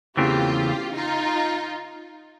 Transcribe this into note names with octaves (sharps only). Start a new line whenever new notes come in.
E2 C#3 E3 A3 C4 F4 G4
D#4 F4